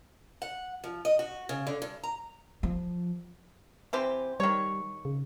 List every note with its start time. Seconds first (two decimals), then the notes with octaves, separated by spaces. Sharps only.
0.42 F#5
0.84 F3
1.05 D#5
1.19 F#4
1.49 C#3
1.67 D3
1.82 G2
2.03 A#5
2.63 F3
3.93 E3 C4 G4
4.40 D#3 G3 C#5
5.05 C#3